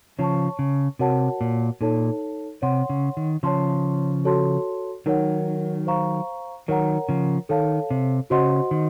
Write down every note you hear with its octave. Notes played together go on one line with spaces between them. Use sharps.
C#3 F3 C#5 A5 C#6
C#3
C3 F#4 A#4 C#5 F#5 A5
A#2
A#2 D#4 A4 C#5 A5
C3 C#5 F#5 C6
C#3
D#3
C#3 F3 C#5 A5 C6
F#4 A4 C#5 A5 C6
D#3 F#3 D#4 A#4 C#5 F#5
C5 F5 A#5 C#6
D#3 F#3 A#4 C#5 F#5 A#5
C#3 F3
D#3 A4 C#5 F5 A5
C3
C#3 F#4 C5 D#5 F#5 C6
D#3